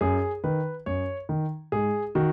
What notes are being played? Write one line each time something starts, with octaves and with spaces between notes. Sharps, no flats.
F#2 G#4
D#3 B4
F#2 C#5
D#3
G#2 G#4
D#3 F#4